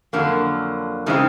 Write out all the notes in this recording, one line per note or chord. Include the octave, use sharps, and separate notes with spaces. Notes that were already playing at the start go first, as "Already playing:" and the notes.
F2 D3 F#3 A#3
C#3 E3 G#3 C4 D#4